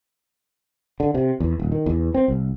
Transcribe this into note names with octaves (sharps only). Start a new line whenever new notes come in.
D3
C3
E2
D#1
D#3
E2
C4
C2